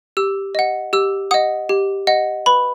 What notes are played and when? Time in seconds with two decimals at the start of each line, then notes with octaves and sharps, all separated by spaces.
0.17 G4 E6
0.55 D#5 F#5
0.93 G4 E6
1.31 D#5 F#5 D#6
1.69 G4
2.07 D#5 F#5
2.46 B4 B5